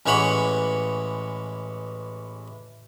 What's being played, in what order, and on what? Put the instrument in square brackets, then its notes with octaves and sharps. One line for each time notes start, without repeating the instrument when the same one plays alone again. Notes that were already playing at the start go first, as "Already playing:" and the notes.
[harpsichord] A1 E3 G#3 C#5 F#5 B5